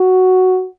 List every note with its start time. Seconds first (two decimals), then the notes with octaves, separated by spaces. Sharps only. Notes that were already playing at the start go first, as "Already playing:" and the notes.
Already playing: F#4